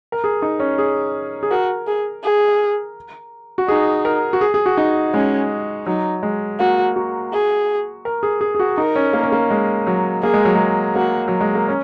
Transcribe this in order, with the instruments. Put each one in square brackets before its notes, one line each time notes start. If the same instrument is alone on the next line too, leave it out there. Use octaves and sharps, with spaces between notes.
[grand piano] A#4
G#4
D#4
C#4
G#4
G#4
[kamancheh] F#4 [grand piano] A#4
[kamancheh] G#4
G#4
[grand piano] F#4
[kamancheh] D#4 [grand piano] G#4
[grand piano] A#4
F#4
G#4
G#4
F#4
D#4
[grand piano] G#3 [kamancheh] C#4
[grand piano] F#3 [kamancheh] D#4
[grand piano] G#3
[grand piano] A#3 [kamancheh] F#4
[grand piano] F#4
[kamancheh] G#4
[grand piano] A#4
G#4
G#4
G#4
F#4
[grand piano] D#4 [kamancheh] A#4
[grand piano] C#4
A#3
C#4
A#3
G#3
F#3
[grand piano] A#3 [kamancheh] G#4
[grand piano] G#3
F#3
G#3
[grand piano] A#3 [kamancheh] F#4
[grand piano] F#3
G#3
A#3
C#4